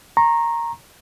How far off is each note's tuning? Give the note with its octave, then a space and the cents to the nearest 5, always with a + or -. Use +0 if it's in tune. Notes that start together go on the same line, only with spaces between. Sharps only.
A#5 +0 C#6 -40